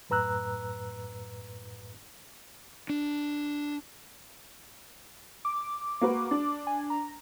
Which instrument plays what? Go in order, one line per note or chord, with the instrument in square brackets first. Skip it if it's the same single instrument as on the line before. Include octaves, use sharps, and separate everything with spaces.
[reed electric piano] F#2 A2 B4 A#5 E6 F#6
[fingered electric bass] D4
[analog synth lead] D6
[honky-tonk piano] A#3 F#4 B4
D4
[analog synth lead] G#5
A#5